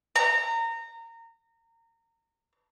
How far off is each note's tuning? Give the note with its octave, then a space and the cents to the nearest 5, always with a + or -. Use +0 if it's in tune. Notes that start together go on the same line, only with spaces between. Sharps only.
A#5 -25